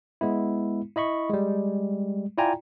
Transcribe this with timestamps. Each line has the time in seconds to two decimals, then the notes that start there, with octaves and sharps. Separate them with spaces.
0.21 G#3 B3 E4
0.96 E4 D#5 B5 C#6
1.30 G3 G#3
2.38 E4 F4 D5 G5 G#5 A#5